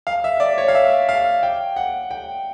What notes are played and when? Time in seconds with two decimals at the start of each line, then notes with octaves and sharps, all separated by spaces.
0.07 F5
0.24 E5
0.40 D5
0.58 C#5
0.68 F5
0.75 E5
1.09 F5
1.43 G5
1.76 F#5
2.11 G5